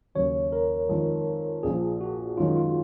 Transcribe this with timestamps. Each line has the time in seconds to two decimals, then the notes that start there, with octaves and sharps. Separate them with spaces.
0.15 D#2 C#3 F#3 C#5
0.52 A#4
0.89 F2 D#3 G#3
1.63 A#1 A#2 F3 G#4
2.01 F#4
2.38 F#2 D#3 G#3 F4
2.56 F4